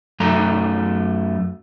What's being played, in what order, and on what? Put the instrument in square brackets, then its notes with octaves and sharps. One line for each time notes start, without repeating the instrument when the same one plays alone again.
[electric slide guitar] F#2 A3 A#5